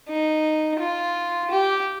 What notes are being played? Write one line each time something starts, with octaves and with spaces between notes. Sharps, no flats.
D#4
F4
G4